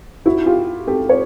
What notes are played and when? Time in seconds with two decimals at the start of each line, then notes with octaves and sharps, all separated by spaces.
0.26 E4 F#4
0.46 F4 G4
0.87 G4 A4
1.09 C#5